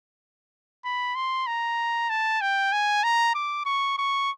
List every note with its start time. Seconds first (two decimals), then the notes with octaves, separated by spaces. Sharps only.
0.85 B5
1.15 C6
1.47 A#5
2.10 A5
2.41 G5
2.73 G#5
3.04 A#5
3.35 D6
3.66 C#6
3.98 C#6